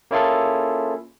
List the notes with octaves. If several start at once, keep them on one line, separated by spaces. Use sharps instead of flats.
A#3 C#4 E4 F4 G#4 A4